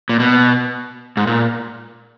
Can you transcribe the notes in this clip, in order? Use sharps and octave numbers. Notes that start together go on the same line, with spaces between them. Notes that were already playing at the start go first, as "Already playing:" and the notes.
A#2
B2
G#2
A#2